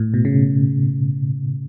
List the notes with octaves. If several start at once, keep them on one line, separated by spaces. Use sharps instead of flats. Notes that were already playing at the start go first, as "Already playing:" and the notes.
Already playing: A2
B2
C#3